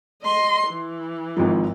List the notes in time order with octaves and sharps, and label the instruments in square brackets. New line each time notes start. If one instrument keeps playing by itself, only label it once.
[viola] D#5 C6
E3
[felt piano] G#1 G#2 F3